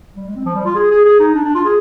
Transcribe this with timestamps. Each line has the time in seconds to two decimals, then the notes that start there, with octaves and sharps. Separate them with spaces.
0.16 G3
0.26 G#3
0.36 C4
0.46 F3
0.55 G3
0.65 F4
0.75 G#4
0.91 G#4
1.05 G#4
1.20 D#4
1.35 D4
1.45 D4
1.55 F4
1.65 G#4